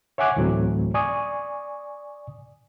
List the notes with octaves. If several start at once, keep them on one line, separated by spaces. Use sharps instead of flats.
C#5 E5 F#5 G#5 D6 F#6
D2 A2 E3 F#3 A3 C4
D5 G#5 C#6 D#6